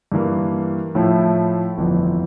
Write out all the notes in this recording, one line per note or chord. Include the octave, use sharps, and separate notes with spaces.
G2 E3 A#3
A2 F3 A3 E4
G1 F2 E3